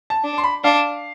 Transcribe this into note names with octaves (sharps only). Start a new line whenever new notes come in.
A5
D4
C6
B5
D4 F5